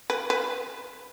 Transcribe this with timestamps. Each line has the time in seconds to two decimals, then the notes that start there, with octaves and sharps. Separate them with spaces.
0.10 B4
0.30 B4